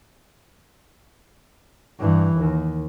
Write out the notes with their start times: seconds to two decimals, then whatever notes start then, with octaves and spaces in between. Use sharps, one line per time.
2.00 G2 E3
2.38 D#2